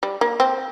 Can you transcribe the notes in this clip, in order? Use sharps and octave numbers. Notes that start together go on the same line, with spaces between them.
G3
A#3
C4